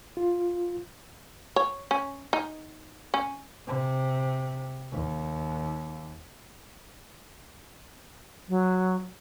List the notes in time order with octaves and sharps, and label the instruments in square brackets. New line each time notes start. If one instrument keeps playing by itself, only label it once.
[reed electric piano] F4
[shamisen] C#5
C#4
D#4
C#4
[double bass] C3
D#2
[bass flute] F#3